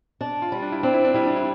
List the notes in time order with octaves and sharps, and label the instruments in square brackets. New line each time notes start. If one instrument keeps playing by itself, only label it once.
[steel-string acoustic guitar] D4
[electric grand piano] F4
[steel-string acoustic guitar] G3
[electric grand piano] D4
E4
[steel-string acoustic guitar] C4 [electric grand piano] D4
[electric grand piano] E4
D4
[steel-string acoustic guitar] G3 [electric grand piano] E4
[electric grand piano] D4
E4